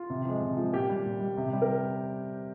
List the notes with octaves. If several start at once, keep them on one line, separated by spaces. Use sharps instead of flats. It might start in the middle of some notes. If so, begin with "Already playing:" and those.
Already playing: F4
C3
F3 G#3
C3
F3 G#3
A#2 G4
G3
A#2
G3
C3
G3
A#4